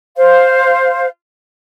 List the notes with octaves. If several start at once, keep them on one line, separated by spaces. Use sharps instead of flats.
C5 F5